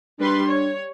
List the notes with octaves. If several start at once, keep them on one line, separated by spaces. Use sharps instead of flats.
G3 D4 B4 C6
C#5